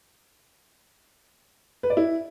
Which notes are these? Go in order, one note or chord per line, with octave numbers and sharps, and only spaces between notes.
B4
D5
E4